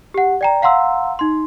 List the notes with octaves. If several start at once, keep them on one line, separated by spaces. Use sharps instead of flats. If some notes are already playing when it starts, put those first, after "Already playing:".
G4 F#5
D5 G5 A#5
F5 F#5 A#5 C6 E6
D#4 C6